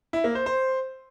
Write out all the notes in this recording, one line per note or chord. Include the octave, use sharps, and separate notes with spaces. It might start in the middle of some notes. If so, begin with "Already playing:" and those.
E4
A#3
C5
C5